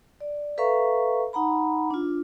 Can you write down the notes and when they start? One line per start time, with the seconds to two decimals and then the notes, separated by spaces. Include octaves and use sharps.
0.20 D5
0.58 A4 B4 E5 F5 A#5 C#6
1.33 D#4 F#5 A#5 B5
1.91 D4 F4